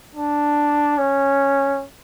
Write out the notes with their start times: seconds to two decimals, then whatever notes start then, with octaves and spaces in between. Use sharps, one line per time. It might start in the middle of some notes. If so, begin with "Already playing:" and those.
0.15 D4
0.98 C#4